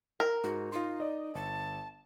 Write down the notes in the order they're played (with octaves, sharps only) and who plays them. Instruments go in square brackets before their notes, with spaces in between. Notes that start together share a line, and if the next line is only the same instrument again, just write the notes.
[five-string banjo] A#4
[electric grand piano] G#2 [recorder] F#4
[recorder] D#4 [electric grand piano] F4 C6
[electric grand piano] D5 D#5
[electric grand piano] G1 [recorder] A5